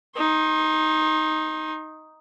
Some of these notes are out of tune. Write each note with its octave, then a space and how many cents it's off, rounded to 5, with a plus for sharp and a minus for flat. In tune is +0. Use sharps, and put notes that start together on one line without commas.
D#4 +5 C6 +40